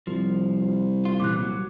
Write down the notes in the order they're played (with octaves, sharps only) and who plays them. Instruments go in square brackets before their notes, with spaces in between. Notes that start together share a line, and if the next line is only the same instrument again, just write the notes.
[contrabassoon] C2 [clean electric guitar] F3
[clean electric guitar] F4
[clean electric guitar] A#2 E3 G3 [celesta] D6 F#6
[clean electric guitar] F#3